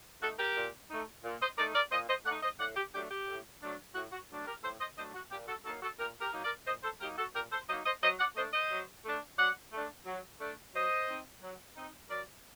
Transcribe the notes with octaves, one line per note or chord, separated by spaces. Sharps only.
A3 D#4 F#4 A4
G4 A#4
A#2
A3 D#4
A#2
C5 D#5
A3 D#4 A#4 D5
A#4 D5
A#2 C5 D#5
C5 D#5
A3 D#4 D5 F#5
C5 D#5
A2 D5 F#5
G4
F#3 A3 D4 G4
G4
A2
F#3 A3 D4
A2 F#4
F#4
F#3 A3 D4
G4 A#4
A2 A4 C5
C5 D#5
F#3 A3 D4 C5 D#5
F#4
A#2 G4
F#4 A4
F#3 A#3 D#4 F#4 A4
F#4 A4
A#2 G4 A#4
G4 A#4
F#3 A#3 D#4
A#4 D5
A#2 C5 D#5
A4 C5
F#3 A#3 D#4 G4 A#4
F#4 A4
A#2 G4 A#4
A4 C5
F#3 A#3 D#4 C5 D#5
C5 D#5
F#3 C5 D#5
D5 F#5
A3 D4 C5 D#5
C5 D#5
F#3
A3 D4
F#3 D5 F#5
A3 D4
F#3
A3 D4
F#3 C5 D#5
C4 D#4
F#3
C4 D#4
F#3 A#4 D5